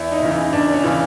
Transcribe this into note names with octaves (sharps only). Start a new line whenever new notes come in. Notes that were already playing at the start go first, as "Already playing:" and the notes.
Already playing: E2 E4
D#4
C#3 E3
D#4
E2 D4
C#4
C#3 E3